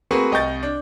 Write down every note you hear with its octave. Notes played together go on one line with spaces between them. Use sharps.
A3 A#3 C4 F#4 G#4 B4
C2 D#5 G5 C#6 G6 A6
D4